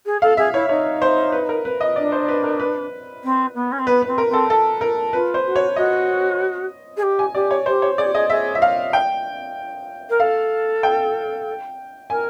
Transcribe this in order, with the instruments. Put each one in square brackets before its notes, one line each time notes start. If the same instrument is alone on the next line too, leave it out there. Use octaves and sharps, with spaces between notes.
[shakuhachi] G#4
[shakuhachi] A4 [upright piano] F5
[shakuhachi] G#4 [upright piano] E5
[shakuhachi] E4 [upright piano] C#5
[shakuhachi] D#4 [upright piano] C#5
[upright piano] C5
B4
A#4
B4
D#5
[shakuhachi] D4 [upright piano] D5
[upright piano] C5
B4
A#4
B4
[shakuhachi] C4
B3
C#4
C4
[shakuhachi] B3 [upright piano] B4
[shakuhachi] C4 [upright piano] B4
[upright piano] A#4
[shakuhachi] C4 [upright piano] A4
[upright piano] A4
A#4
[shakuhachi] F4 [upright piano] B4
[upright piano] C5
[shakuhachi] F#4
[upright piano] C#5
[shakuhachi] F#4 [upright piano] D#5
[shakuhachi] G#4
G4
[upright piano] G#5
[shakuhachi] G4 [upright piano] D5
[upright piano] C#5
[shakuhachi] G4 [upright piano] C5
[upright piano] C#5
[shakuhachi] G#4 [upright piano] D5
[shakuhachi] G4
[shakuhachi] G#4 [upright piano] D#5
[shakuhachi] G#4 [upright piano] E5
[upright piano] E5
F5
G5
[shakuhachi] A#4
[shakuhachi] A4 [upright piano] F5
[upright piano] G5
[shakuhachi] A#4 [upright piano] G#5